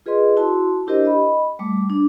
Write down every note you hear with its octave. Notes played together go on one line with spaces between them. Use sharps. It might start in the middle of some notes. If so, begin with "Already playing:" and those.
F4 G#4 B4 D#5 C6
E4 F#4 A5 C6
D4 E4 G4 A#4 C5 D#5
D#5 B5
G3 A3 D6
D4